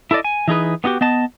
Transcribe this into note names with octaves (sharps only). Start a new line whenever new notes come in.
E4 A4 A#4 D5 D#5
G#5
E3 D#4 G#4 B4
B3 D#4 F#4 G4
B3 D#5 A5